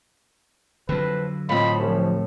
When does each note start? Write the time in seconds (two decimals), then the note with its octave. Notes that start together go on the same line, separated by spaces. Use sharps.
0.89 F2 D3 F#3 C4 B4
1.49 A2 C4 F4 D#5 B5
1.79 C2 F3 C#4